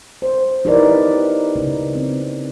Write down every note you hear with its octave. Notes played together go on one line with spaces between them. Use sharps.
C5
D#4 E4 G4 A#4 B4 D5
C#3 A#3 C#4
C4